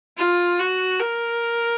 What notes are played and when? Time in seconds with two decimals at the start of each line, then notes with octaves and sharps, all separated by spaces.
0.18 F4
0.59 F#4
1.00 A#4